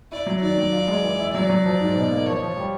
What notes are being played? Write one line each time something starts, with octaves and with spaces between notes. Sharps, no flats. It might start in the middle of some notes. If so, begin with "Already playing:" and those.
E4 D5
F#3
D#3 D5
F#3
F4
G#3
E3
E4
F#3 D5
F#3
F3
G#2
B2
A#3
F3 C#5
F3
G3